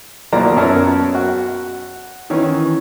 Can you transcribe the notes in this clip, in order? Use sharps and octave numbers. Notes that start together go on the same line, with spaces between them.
B1 F3 F#3 A#3 D5 A#5
F#2 B3 A#4 C#5 A5 E6
F#4
D#3 E3 C#4